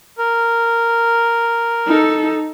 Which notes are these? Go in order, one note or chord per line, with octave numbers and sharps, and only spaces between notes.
A#4
D#4 A4